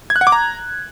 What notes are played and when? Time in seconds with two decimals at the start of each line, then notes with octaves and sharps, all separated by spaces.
0.10 G#6
0.16 F#6
0.21 F#5
0.27 D6
0.32 A#5